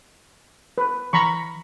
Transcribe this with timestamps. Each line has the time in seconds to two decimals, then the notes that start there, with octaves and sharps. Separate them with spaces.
0.78 B4
1.13 E3 A#5 B5 C#6